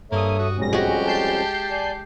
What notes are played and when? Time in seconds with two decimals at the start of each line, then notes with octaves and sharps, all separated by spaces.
0.12 G2 A#3 A4 C#5 E5 D#6
0.39 F#4
0.57 B1 F2 G#2 G3 C#4 A#6
0.73 G#3 F#4 G4
1.06 A5 G6 C7
1.71 D5 G#5